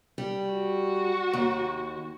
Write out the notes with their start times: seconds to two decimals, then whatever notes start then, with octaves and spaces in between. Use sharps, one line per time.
0.18 G3
0.53 F#4
1.33 D#2